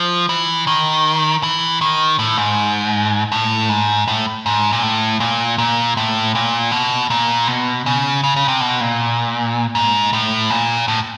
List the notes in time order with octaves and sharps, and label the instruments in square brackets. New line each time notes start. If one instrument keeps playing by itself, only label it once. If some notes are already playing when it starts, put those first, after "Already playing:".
Already playing: [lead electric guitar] F3
E3
D#3
E3
D#3
A2
G#2
A2
G#2
A2
G#2
A#2
A2
A#2
A#2
A2
A#2
B2
A#2
B2
C#3
C#3
C#3
C3
B2
A#2
G#2
A2
A#2
A2